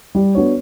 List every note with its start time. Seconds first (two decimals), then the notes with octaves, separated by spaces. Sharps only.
0.15 G3
0.35 B3 D4 F#4 C#5